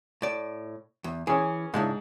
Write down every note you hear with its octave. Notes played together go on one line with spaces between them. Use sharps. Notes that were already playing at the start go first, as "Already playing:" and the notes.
A2 D5
E2
E3 C#4 G#4
G#2 C#3 D4 E4